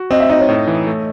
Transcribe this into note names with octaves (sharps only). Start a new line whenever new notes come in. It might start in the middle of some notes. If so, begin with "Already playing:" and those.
Already playing: F#4
C4 D#5
E5
D#4 D#5
C#5
A2
E3
A3